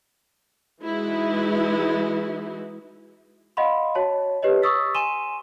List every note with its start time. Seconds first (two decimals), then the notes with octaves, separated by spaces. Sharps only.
0.83 E3 G#3 D#4 E4 F#4
3.57 D#5 F5 F#5 B5 C6
3.95 F#4 C#5 A5
4.43 G4 B4 C#5 D#5
4.62 C#6 D#6 E6 A6 B6
4.95 G#5 C6 D#7 E7 G7